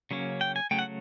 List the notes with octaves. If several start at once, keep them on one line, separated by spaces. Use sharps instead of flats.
C#3 F#3 A#3 C#4
G5
G#5
C#3 F#3 A3 G5
F#5